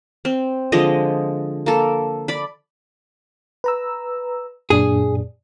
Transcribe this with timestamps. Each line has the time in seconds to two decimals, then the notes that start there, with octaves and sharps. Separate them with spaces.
0.25 C4
0.72 D3 F3 G#3 D#5
1.66 A#3 A4
2.28 D5 B5
3.64 B4 A#5 E6
4.70 F#2 A#2 D4 G#4